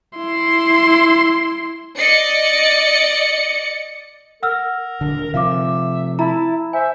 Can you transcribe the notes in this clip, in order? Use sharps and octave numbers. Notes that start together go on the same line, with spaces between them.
E4 C6
D5 D#5 C#7
A#4 F#5 E6 F6
D#1 D3
C3 F3 E5 F5 D6
E4 A5 A#5
C5 E5 G#5